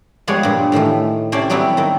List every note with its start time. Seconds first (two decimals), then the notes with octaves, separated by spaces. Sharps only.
0.27 F3 G3 G#3 B3 G#4 C#5
0.43 G2 A#2
0.72 A2 D#3 E3 A3
1.32 C3 C#4 C5 D5 A5
1.50 F#3 G3 B3 C4 E4
1.77 D#3 C4